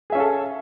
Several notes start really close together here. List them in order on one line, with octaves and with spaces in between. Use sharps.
G#4 E5 C#4 F5 A4